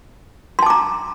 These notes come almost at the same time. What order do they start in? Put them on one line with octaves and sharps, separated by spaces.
C6 A5 D6 A#5